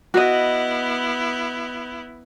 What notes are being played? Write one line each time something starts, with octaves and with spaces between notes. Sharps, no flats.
B3 E4 F#4 D#5